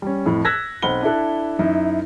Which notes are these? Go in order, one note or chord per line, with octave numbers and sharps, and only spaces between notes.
G3 C#4
F2 A2
E6 F#6 G#6 A#6 B6
B1 C4 F#5 B5 G7
D4 E4 A4 F#6
F#2 D#4 E4